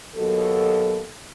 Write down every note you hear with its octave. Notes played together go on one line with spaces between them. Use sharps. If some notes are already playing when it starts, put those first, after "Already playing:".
D#2 B2 F#3 A4